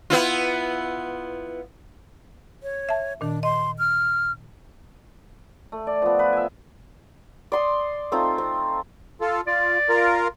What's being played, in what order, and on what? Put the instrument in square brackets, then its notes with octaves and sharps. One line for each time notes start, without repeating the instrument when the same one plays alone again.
[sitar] B3 E4 F4
[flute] C#5
[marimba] E5 A5
[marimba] A#2 D#3 [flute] D4
[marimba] D#5 [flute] C6
[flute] F6
[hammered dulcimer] A3
D5
F3 B3
B4
E5 G#5
[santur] D5 C6 D#6
A3 C4 D#4 F4
C4
[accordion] F4 A4
[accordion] F4 [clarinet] D5
[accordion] F4 A#4